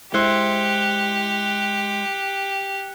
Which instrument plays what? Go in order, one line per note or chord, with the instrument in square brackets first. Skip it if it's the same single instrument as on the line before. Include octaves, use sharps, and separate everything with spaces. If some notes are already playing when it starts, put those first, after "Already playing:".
[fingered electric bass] G#3 [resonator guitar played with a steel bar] E4 C5 [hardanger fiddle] G4 [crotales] F#6 C#7 G7